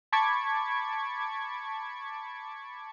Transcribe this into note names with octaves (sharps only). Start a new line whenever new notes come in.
A5 B5 C#6 D6 G#6